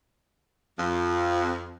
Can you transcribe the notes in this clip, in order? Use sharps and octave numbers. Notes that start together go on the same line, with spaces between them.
F2 F3